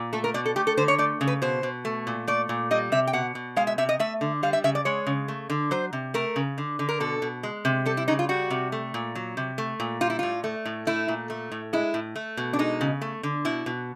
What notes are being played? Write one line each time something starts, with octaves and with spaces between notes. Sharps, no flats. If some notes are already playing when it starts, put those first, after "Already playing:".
Already playing: A#2
A3 A4
A#4
B2 D5
A4
A3 G4
A4
D3 C5
C#5
A3 D5
C#3
B4
B2 C5
B2
A3
A#2
A3 D5
A#2
G3 D#5
C3 E5
G5
B2 F#5
B2
G#3 F5
E5
C3 E5
D#5
A3 E5
D3
G3 F5
E5
C#3 E5
D5
G#3 C#5
C#3
A3
D3
F#3 C5
C3
A3 A#4
C#3
D3
D3
A#4
B2 A4
B2
G#3
C3
G3 A4
E4
C#3 D#4
F4
G3 F#4
C3
A3
A#2
F#3
C3
A3
A#2
G3 F4
E4
A2 F4
A3
A2
A3 E4
A#2
A3
A2
G#3 E4
A2
A3
B2
D4
G#3 D#4
C#3
A3
D3
B2 E4
B2